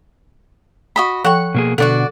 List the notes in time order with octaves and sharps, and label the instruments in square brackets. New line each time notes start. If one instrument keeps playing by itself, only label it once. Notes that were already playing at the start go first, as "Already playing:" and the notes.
[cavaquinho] F#4 D#5 B5
[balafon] F3 A4 G5 [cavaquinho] F#5 C#6
[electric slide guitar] B2 A#3 G#4
[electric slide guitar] B2 D3 [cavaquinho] F#4 D5 F#5 [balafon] A4